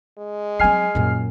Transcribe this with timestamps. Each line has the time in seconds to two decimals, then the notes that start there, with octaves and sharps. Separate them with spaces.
0.18 G#3
0.59 F#3 C4 G#5 F6 C7
0.95 F#2 A#2